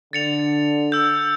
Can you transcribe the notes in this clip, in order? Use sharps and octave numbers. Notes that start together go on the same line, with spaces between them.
D3 A6 C#7 F7
E6 G6